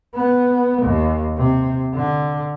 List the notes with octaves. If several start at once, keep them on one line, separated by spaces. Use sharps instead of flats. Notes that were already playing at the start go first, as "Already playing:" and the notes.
B3
D#2
C3
D3